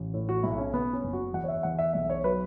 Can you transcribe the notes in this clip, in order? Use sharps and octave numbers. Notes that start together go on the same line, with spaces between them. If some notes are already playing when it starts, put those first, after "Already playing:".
Already playing: A1
A2
F#4
B1 E4
C#4
C#3 B3
C#4
F#1
F#4
E2 F#5
C#5
E5
E2 F#5
E5
B1 E5
C#5
F#3 B4